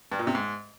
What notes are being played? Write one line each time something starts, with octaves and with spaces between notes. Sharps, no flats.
G2
A#2
C3
G#2